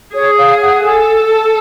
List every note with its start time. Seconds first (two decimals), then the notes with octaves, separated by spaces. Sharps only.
0.14 G#4 C#5
0.38 F5
0.62 F#5
0.84 A4 G#5
1.31 A5